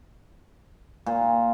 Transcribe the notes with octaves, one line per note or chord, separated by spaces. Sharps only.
A#2